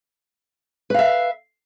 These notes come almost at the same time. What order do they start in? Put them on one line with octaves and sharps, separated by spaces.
B4 F5 E5